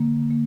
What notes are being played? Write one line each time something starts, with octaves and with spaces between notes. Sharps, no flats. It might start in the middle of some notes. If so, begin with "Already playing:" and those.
Already playing: D3 A#3
A#3